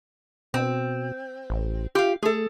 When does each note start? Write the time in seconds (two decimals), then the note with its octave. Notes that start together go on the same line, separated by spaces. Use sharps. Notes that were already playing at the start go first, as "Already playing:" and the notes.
0.54 B2 C4
1.50 A1
1.95 F4 G4 F5
2.22 A3 G#4 A4